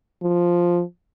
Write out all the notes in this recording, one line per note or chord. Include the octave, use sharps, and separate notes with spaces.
F3